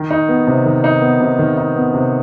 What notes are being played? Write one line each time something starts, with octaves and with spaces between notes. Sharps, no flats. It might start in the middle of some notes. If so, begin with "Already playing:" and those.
Already playing: D#3
D#4
B3
C3
D#3
D#4
B3
C3
D#3
D#4
B3
C3